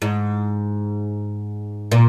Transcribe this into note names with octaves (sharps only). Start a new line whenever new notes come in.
G#2
A#2